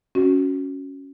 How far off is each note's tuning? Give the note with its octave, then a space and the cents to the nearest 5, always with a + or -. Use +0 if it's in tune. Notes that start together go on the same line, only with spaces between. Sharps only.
C#4 +0 F#4 +0